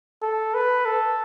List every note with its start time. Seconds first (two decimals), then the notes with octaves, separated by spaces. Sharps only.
0.22 A4
0.54 B4
0.86 A4